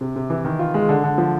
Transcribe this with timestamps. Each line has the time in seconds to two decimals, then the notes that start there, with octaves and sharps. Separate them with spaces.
0.01 C3
0.16 C3
0.30 E3
0.45 D#3
0.59 F4
0.74 G#3
0.89 D3
1.04 D3
1.18 F3